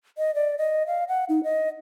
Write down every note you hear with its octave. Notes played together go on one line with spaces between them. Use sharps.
D#5
D5
D#5
F5
F#5
D#4
D#5